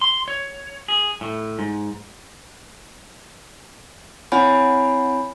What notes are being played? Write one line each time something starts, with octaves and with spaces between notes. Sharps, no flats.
C6
C#5
G#4
A2
G#2
C4 E4 C#5 F#5 G#5 B5